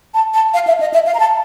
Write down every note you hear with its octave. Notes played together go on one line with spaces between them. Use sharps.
A5
A5
F5
E5
D#5
E5
F5
A#5
A5